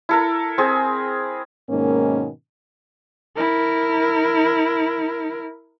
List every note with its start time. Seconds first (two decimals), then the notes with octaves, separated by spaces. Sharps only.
0.09 E4 A4 A#4
0.58 C4 G#4
1.69 G#2 B2 D#3 A#3 C#4
3.36 E4 A#4